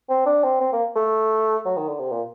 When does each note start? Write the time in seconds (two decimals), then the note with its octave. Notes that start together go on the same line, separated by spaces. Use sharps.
0.09 C4
0.26 D4
0.44 C4
0.60 C4
0.73 A#3
0.96 A3
1.65 F#3
1.77 D#3
1.88 D3
1.99 C3
2.12 A#2